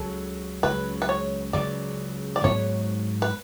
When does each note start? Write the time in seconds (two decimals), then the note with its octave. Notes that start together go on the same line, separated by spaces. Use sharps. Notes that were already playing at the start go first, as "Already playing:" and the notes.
Already playing: C#2 C#3 F#3 A4
0.63 C#2 C#3 F#3 B4
1.02 B4
1.09 C#5
1.53 C#2 C#3 F#3 D5
2.36 D5
2.44 G#2 F#3 B3 C#5
3.22 B4